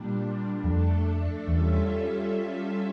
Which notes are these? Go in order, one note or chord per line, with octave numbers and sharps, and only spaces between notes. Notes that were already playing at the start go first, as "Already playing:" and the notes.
Already playing: A#2 G3 D4
F2 A3 D4 A4
E2 G3 C#4 F4 A4 E5